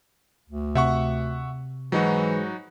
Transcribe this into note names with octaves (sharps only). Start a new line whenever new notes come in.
D2
C3 E5 F#5 C#6
G#2 E3 F#3 D#4 F#4